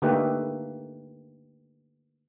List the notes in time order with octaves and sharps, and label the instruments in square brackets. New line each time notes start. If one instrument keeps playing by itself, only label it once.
[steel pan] D3 A3 A#3 D#4 G4 B4